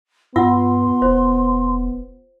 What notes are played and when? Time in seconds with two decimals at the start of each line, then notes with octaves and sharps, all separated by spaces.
0.36 G2 B3 F4 F#5 C6 E6
1.02 E1 C5